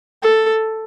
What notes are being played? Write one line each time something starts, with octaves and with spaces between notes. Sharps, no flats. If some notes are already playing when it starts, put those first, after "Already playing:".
A4